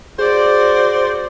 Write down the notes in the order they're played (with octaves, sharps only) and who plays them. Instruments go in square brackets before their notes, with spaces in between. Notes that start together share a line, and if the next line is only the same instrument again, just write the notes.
[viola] F#4 D5 [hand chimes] G#4 [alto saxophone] C5